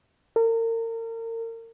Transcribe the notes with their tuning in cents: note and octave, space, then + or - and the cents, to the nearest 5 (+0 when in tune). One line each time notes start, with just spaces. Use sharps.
A#4 -35